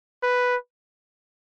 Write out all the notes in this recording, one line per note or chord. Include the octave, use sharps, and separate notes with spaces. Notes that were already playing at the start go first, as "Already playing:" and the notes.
B4